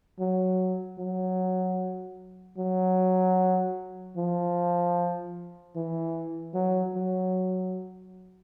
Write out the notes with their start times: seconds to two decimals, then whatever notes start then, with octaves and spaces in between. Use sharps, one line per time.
0.20 F#3
0.99 F#3
2.58 F#3
4.17 F3
5.76 E3
6.54 F#3
6.94 F#3